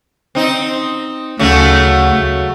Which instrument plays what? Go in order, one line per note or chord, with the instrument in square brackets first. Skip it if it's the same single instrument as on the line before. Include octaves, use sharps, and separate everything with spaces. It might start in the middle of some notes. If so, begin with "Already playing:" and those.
[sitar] C4 D#4
[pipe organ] D2 [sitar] C#3 F#3 A3